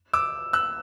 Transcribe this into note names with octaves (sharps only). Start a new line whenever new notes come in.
D6 E6
E6 F#6